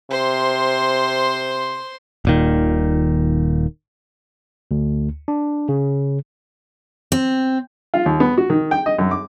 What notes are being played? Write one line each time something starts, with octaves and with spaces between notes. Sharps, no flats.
C3 C5 C6
D#1 A#2 D#3
D2
D4
C#3
C4
F4
D#2
B3
F#4
D#3
G5
D#5
F#2
D6